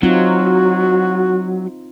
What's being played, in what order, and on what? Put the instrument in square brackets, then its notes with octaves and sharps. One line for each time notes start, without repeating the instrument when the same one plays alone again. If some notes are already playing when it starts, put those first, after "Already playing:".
[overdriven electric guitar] F#3 [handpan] C4 D#4 F4 [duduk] F#4